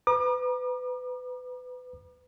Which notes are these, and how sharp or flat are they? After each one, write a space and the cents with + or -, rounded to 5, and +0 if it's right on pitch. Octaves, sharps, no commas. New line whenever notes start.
B4 +25 A#5 +45 D6 +45